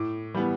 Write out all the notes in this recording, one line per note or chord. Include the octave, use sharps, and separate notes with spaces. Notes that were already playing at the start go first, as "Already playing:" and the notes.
Already playing: A2 D6
E3 G3 B3